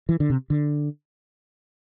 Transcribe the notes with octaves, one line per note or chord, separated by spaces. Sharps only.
E3
D3
C3
D3